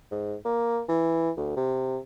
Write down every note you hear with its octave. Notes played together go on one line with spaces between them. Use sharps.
G#2
A#3
E3
D2
C3